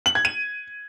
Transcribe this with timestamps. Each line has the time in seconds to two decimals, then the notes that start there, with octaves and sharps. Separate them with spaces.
0.06 F#7
0.15 G#6
0.25 D#7